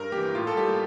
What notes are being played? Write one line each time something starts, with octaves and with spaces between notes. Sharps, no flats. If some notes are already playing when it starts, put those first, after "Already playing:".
Already playing: G2 A#4
E3 A#3 G4
A2 F4
A4
G3 A#3 G4